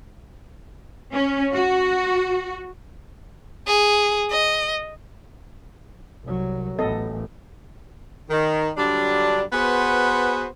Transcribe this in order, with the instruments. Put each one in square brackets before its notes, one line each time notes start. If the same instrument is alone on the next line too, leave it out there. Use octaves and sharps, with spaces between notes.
[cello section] C#4
F#4
[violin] G#4
D#5
[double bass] C2 F#3
[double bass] A1 E3 [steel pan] B3 A4 D#5
[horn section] D#3
D3 F#3 G3 D4
B3 F#4 G#4 B4 C5